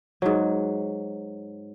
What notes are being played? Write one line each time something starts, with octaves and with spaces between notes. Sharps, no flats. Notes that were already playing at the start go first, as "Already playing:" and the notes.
G#2 F#3